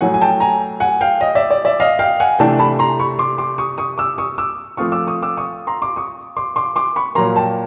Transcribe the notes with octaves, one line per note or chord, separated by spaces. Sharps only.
A2 F#3 A3 F#5 G#5
G#5
G5 A5
G#5 A#5
F#5 G#5
F5 G5
D#5
D5 E5
D5
D5 E5
D#5 F5
F5 G5
F#5 G#5
C3 E3 A3 D4 G5 A5
A5 B5
A#5 C6
B5 C#6
C6 D6
C6 D6
C#6 D#6
C#6 D#6
D6 E6
C#6 D#6
D6 E6
F3 A3 C4 F4 C#6 D#6
D6 E6
C#6 D#6
D6 E6
C#6 D#6
A#5 C6
C6 D6
C#6 D#6
C6 D6
C6 D6
C6 D6
B5 C#6
A#2 F#3 A#3 A#5 C6
G5 A5